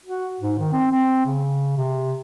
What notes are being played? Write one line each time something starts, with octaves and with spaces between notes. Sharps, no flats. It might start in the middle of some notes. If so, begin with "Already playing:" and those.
F#4
G#2
D#3
C4
C4
C#3
C3